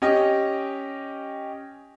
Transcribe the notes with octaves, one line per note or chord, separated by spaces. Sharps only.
C#4 G4 D#5